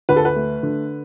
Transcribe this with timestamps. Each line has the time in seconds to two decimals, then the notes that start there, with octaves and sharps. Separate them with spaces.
0.09 D2 B4
0.16 A4
0.25 B4
0.36 A3
0.63 D3